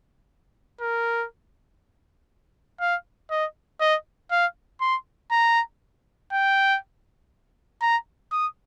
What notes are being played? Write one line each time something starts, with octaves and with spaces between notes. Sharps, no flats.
A#4
F5
D#5
D#5
F5
C6
A#5
G5
A#5
D#6